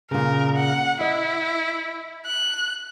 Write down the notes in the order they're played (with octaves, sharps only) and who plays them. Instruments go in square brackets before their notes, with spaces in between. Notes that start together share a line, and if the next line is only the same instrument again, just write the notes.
[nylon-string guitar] A#2 C#3 [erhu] A#4
[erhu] F#5
[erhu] E4 [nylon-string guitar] D#5
[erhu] F#6